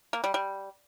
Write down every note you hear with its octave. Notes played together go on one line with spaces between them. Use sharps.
A#3
G3
G3